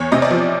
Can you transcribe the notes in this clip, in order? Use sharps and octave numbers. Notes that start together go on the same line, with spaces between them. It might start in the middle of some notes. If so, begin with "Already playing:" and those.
Already playing: E2 C#5
C3 D#5
D5
F3